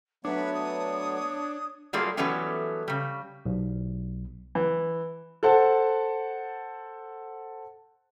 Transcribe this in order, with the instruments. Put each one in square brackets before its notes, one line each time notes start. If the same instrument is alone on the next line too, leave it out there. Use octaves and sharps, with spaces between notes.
[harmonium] F#3 A3 B3 [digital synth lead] D4 [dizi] B4 [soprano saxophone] C#5
[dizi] D#6
[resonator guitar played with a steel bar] F#3 G3 A3 A#3 F4 G#4
E3 F#3 G3 A3 B3 C#4
C#3 G3
[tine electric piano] B1
[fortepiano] E3
[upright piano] A4 C5 F#5 A5